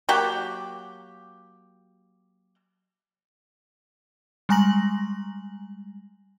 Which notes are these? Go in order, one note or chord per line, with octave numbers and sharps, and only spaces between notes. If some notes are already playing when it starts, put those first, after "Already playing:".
F#3 A#3 F#4 G4
G3 G#3 G#5 A#5 A#6 F#7